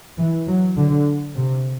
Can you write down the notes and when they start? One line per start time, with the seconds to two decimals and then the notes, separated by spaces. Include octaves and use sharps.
0.17 E3
0.47 F#3
0.76 D3
1.35 C3